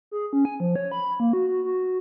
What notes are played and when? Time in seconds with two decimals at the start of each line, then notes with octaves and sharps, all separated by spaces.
0.11 G#4
0.33 C#4
0.45 G#5
0.60 F3
0.76 C#5
0.92 B5
1.20 A#3
1.33 F#4
1.49 F#4
1.64 F#4